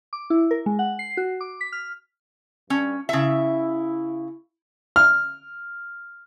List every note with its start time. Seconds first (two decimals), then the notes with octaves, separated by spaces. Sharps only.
0.13 D6
0.30 E4
0.51 A#4
0.66 G#3
0.79 F#5
0.99 C7
1.17 F#4
1.41 D6
1.61 B6
1.72 F6
2.70 G2 C#4 D4
3.09 C#3 E4 E5
4.96 F6